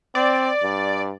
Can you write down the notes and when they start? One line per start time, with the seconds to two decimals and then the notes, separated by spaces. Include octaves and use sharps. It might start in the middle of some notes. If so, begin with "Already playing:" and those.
0.15 C4 D5
0.63 G2